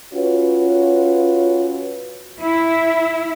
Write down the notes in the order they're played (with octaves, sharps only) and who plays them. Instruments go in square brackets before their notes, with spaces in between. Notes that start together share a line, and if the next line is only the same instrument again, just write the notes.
[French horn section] C#4 F4 F#4 B4 C#5
[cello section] E4